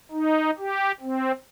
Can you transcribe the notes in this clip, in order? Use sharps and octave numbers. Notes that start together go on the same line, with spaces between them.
D#4
G4
C4